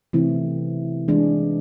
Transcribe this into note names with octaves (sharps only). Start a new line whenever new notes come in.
C3 E3 A3 C4 E4
E3 G#3 D4 G#4